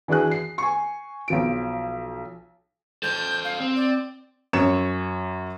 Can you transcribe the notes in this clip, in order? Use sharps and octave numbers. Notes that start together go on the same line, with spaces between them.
E3 D4 F#4 G#4 F#6
C7
G#5 C#6
B1 F3 D7
A4 C5 G6
F5
C4
D5
F#2 C#5 E7